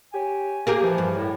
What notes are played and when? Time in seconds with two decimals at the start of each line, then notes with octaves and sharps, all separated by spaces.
0.13 G4 C#5 G#5
0.67 A#3 G4 G#4 A#4
0.82 E3 F3
0.98 G2
1.15 A2